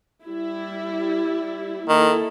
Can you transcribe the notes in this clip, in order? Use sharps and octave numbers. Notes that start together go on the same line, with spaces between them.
G3 E4
D#3 A#3 E4 A4